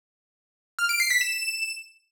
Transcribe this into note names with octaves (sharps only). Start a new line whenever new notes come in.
F6
D7
C7
B6
E7